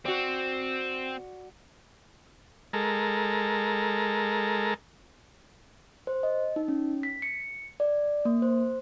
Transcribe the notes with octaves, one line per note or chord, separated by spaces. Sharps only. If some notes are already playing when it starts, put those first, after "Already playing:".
C4 F#4 D5
G#3 A4 A#4
C5
D#5
D#4
C#4
B6
C#7
D5
A#3
C5